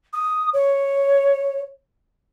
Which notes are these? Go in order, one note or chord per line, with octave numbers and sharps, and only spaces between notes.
D#6
C#5